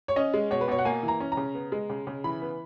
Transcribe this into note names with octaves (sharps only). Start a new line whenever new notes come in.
C#5
C#4 D#5
G#3
B2 C#5
B4
B2 C#5
F#5
A#3 G#5
E3
A#5
C#4
A#5
C#3
B3
G#3
C#3
C#3
E3 B5
B3